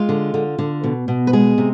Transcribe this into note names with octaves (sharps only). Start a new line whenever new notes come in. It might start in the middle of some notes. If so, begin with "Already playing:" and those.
Already playing: G#3 F4
D3
D3
D3
B2
B2
B4
G#3 G#4
C3